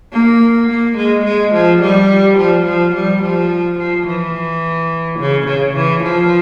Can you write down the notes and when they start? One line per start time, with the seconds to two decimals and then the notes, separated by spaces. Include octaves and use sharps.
0.12 A#3
0.69 A#3
0.97 G#3
1.25 G#3
1.53 F3
1.82 G3
2.38 F3
2.65 F3
2.95 G3
3.22 F3
3.79 F3
4.06 E3
5.19 C#3
5.47 C#3
5.76 E3
6.03 F3